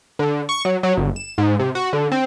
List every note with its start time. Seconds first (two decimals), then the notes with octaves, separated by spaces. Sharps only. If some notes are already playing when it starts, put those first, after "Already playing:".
0.19 D3
0.49 C#6
0.65 F#3
0.83 F#3
0.97 G1
1.16 E7
1.38 G#2
1.59 C3
1.75 F#4
1.93 D3
2.12 C4